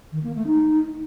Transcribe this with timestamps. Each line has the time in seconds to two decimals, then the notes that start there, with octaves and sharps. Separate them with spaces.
0.12 D#3
0.24 A#3
0.35 A3
0.47 D#4